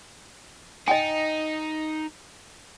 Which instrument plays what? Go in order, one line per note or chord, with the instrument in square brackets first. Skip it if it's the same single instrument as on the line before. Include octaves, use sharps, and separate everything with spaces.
[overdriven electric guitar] D#4 [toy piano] D#5 G5 G#5